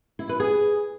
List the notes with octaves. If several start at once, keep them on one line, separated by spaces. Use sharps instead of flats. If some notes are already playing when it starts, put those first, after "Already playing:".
E4
B4
G#4